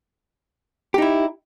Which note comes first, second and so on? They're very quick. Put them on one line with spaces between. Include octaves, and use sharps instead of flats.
G4 D#4 E4